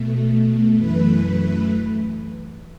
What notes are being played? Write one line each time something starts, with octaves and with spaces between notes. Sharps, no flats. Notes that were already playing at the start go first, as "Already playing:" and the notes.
Already playing: B2 A3
F#2 E3 A3 B4